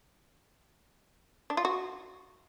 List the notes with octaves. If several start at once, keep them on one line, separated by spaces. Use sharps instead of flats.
D4
F4
F#4